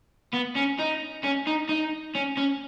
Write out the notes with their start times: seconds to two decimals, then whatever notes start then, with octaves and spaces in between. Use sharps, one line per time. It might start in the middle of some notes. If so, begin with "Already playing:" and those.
0.33 B3
0.55 C#4
0.79 D#4
1.23 C#4
1.47 D#4
1.69 D#4
2.15 C#4
2.38 C#4